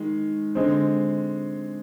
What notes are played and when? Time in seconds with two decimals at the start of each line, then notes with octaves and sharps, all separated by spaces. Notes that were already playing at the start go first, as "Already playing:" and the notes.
Already playing: D#3 G#3
0.55 D3 G#3 C4